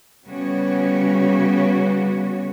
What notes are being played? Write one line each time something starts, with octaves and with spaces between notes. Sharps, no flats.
C#3 G3 B3 F#4 C#5